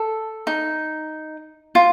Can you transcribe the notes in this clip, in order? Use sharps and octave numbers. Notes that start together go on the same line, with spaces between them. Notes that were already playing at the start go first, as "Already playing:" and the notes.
Already playing: A4
D#4
F4